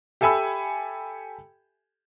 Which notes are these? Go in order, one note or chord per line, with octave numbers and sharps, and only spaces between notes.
G4 A4 E5 G#5 B5 E6